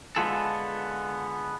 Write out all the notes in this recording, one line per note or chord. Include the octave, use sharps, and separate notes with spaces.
D3 G#3 B3 F4 G#4 A4